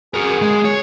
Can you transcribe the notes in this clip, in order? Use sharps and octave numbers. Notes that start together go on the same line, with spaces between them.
F#4 G#4 A#4
G#3
C#5